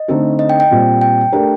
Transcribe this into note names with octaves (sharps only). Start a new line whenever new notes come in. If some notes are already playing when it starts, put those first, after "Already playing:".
Already playing: D#5
D3 A3 C4 D#4 A4
D#5
G5
G5
A#2 G3 C4 F4 C5
G5
A3 D4 G4 A#4